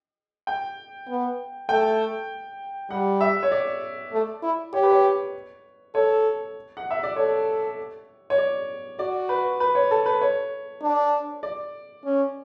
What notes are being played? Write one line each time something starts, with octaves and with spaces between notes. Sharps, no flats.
G5
B3
A3 G5
G3 F#5
E5
C#5
D5
A3
E4
G4 C#5
B4
C#5
A4 C#5
F#5
E5
D5
A4 C#5
C#5
D5
F#4 D5
B4
B4
C#5
A4
B4
C#5
D4
D5
C#4